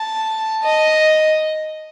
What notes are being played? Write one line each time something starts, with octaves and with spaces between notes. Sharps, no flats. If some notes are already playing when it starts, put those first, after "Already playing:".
Already playing: A5
D#5